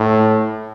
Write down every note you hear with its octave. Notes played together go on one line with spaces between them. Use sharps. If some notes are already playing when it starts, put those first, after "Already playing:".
Already playing: A2